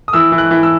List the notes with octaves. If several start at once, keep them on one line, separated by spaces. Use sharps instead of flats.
D#6
E3 E6
E3
F#6
E3
E6